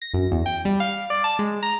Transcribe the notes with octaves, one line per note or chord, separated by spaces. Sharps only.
A#6
F#2
E2
G5
G3
F5
D5
A5
G#3
A#5